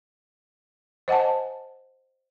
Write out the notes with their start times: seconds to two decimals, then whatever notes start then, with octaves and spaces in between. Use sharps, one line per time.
1.08 C5 D#5 F#5 G#5 A5